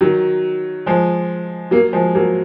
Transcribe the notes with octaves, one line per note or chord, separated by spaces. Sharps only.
D#3 F#3
F3 G#3
F#3 A#3
F3 G#3
F#3 A#3